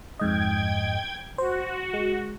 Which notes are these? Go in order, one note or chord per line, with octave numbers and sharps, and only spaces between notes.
F2 G#2 D#5 G5 G#6
F#4 C5
G#3